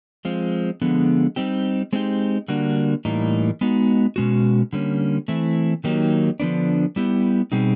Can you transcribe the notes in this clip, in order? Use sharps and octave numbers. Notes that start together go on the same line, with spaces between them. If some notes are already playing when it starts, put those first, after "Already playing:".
F3 G#3 C4 F4
D3 F3 G#3 B3
G3 C4 D#4 G4
G#3 C4 D#4 G4
D3 G3 A#3 D4 F#4
A2 E3 G3 A#3 D#4
G#3 B3 D#4 F#4
B2 G#3 C#4 F#4
D3 G3 A#3 C#4
E3 A3 C4 E4
D#3 F#3 A#3 D#4 G4
D3 F3 G#3 B3 D4
G3 B3 E4 G4
B2 G3 C4 D#4 G#4